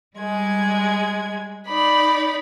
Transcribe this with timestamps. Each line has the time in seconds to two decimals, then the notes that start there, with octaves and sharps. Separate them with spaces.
0.16 G3 G#3 G#6
1.68 D#4 D5 B5